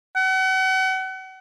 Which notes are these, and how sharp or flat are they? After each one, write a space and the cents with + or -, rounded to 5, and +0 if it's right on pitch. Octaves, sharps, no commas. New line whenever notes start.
F#5 +35